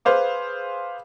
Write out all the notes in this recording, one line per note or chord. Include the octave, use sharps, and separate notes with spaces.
G#4 B4 C5 F5 D6